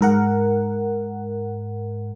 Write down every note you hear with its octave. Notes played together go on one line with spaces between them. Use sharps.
G#2 A#4 F#5